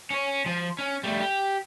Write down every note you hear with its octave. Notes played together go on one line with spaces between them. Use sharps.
C#4 C#5
F3
C#4
G3 A3
G4